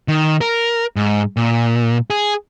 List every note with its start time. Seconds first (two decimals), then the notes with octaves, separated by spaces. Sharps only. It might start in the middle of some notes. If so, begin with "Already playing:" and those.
0.08 D#3
0.41 A#4
0.96 G#2
1.37 A#2
2.10 G#4